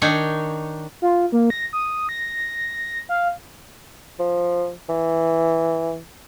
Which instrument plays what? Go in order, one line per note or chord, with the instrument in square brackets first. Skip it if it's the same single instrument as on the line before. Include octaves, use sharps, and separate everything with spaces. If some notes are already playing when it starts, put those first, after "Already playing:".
[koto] D#3 D4 D#4 C#5
[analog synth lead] F4
A#3
A#6
D#6
A#6
F5
[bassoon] F3
E3